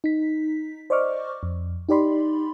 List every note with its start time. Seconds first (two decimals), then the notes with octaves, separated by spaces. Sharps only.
0.04 D#4 B6
0.90 C5 D5 D#5 C#6 D6 F6
1.43 F2
1.89 D#4 G4 D5 B5 C6